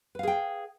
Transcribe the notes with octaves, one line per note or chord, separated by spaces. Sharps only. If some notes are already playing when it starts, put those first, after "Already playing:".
G#4 B4 F5 G5